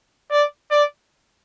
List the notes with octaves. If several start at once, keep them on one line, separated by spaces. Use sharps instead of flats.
D5
D5